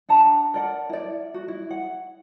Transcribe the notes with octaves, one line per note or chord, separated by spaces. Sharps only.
D4 F#5 A5 A#5
A#4 D5 F#5
E4 D5
F#4
E4
F#5